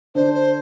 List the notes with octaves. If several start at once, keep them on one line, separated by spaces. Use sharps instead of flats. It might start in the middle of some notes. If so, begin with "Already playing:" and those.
D3 D4 C5
C5